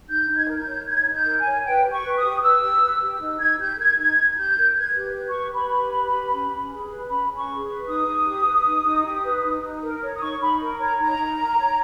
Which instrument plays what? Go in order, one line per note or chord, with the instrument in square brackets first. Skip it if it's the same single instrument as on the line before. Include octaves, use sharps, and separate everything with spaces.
[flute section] D#4 G6
D#4
G#6
A#4
G6
C#5
D#4 G#6
D#4
G6
A#4
G#5
C#5
B4 G5
G4
C#6
B4
D#6
G4
B4 E6
G4
B4
G4
D#4
D#4 G#6
G4 G6
A#4 G#6
D#4 G#6
D#4
G4 G6
A#4
B4 G#6
G4
B4
C#6
G4
B4 B5
G4
B4
G4
C#4
C#4
G#4
B4
C#4 B5
C#4
C#6
G#4
B4
D#4 D#6
D#4
G4
B4
D#4
D#4
G4
B4
D#4
D#4
A#4
C#5
D#6
D#4 C#6
D#4 B5
A#4
C#5 A#5
D#4 A#5
D#4
A#4
C#5